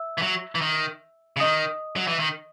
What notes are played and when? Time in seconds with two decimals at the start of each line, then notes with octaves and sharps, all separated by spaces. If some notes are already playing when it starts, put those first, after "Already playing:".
Already playing: E5 E6
0.18 E3
0.22 F#3
0.55 E3
0.61 D#3
1.37 C#3
1.40 D#3 D#5 D#6
1.96 F#3
2.07 E3
2.20 D#3